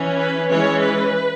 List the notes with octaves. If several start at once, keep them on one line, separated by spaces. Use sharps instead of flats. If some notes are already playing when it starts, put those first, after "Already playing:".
Already playing: E3 C#4
B4
E3 G#3 C#4 C#5
B4